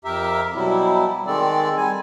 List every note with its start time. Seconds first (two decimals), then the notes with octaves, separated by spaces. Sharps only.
0.05 F2 G4 A#4 E5
0.55 B2 F#3 G3 E4
1.27 D#3 G#3 C4 A4 D5
1.78 G3 G#5